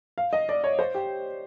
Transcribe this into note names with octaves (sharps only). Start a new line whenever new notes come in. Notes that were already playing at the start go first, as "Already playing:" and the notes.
F5
D#5
D5
C#5
C5
G4